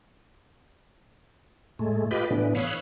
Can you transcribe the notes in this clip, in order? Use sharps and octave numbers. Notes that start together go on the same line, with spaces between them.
A2 G#3 A3
F4 G4 B4 D#5 B5 D6
A2 E3 B3 D4
C#5 F5 B5 D#6 E6 F#6